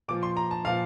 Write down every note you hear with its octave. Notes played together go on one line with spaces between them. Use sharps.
A#2 F3 D6
C6
A#5
A5
A#2 F3 F5